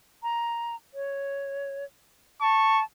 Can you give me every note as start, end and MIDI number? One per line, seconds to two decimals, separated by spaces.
0.23 0.75 82
0.94 1.84 73
2.41 2.83 81
2.41 2.81 85